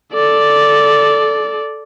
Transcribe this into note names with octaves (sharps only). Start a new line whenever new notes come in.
A4 D5